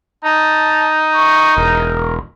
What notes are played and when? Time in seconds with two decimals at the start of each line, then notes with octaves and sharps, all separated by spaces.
0.25 D#4 A5
1.15 C#6
1.57 E1 A#4